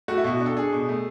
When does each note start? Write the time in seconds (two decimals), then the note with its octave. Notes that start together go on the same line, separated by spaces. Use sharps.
0.08 A3 F#4
0.18 E4
0.24 B2 F#4
0.40 D4
0.46 A4
0.57 D4 G#4
0.72 B2
0.89 A3